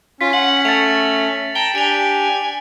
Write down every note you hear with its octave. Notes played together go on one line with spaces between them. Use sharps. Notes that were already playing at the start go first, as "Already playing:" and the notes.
C#4 F4 B6
F#5 F#7
A3 A6 C#7 F7
G5 A5 A#5 G7
D4 G4 G#5 D7 F7